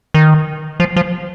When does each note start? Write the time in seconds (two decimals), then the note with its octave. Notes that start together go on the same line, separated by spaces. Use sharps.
0.14 D#3
0.80 F3
0.96 F3